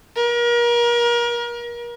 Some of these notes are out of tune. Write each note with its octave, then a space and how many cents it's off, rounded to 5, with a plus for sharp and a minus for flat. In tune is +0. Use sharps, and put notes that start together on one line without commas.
A#4 +35